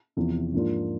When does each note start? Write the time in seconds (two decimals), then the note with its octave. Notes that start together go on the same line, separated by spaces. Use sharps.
0.17 E2 C3 F3
0.53 G#2 F3 A#3 D4 F4